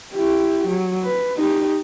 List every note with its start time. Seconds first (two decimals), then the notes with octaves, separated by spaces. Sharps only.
0.14 E4 G4
0.68 F#3
1.03 B4
1.37 D#4 G4